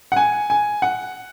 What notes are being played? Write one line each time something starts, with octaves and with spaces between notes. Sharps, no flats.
F#5
G#5
G#5
F#5